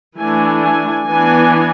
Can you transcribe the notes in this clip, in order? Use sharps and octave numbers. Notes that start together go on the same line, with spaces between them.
E3 A3 D4 G#5
G#5
E3 B3 D4 G#5